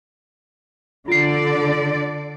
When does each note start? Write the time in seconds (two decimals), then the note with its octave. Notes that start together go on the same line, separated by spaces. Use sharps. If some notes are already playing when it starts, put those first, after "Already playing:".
1.08 D3 F4 D5 C7